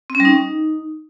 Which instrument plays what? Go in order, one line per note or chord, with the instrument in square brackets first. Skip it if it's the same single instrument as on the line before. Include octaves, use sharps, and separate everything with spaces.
[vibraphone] C4
C#4
G3
D#4